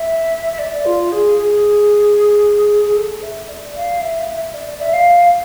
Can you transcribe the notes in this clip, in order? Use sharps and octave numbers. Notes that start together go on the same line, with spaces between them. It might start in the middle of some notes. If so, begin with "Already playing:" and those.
Already playing: E5
E5
D5
F4
G#4
G#4
G#4
A4
E5
D5
F5
E5
E5
D5
D5
E5
F5